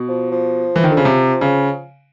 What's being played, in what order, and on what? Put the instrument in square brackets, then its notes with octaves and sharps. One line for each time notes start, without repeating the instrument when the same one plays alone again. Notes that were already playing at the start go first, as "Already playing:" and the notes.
Already playing: [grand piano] B2
[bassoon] F3
F3
[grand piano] E3
D#3
D3
C#3
C3
C#3